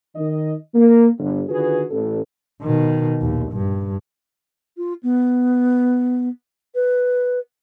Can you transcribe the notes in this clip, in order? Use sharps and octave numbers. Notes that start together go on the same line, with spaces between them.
D#3 D#5
A#3
G1
D3 D#3 F4 F#4 G#4 B4
A1 A4
B2 D#3
A#1 D#2
G2
F4
B3
B4